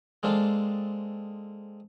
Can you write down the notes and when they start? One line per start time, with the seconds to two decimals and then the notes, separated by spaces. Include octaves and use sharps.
0.23 G#3 A#3 C4 D4 A4